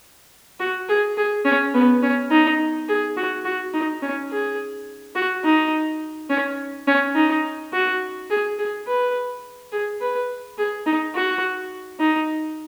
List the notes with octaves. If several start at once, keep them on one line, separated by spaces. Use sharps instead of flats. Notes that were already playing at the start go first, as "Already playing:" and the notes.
F#4
G#4
G#4
C#4
B3
C#4
D#4
G#4
F#4
F#4
D#4
C#4
G#4
F#4
D#4
C#4
C#4
D#4
F#4
G#4
G#4
B4
G#4
B4
G#4
D#4
F#4
D#4